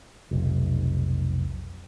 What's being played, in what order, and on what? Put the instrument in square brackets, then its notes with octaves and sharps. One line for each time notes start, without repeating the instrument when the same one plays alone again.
[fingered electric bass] F1 B1